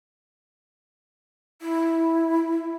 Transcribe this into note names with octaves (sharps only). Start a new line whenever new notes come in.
E4